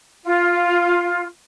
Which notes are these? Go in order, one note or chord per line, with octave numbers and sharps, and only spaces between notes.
F4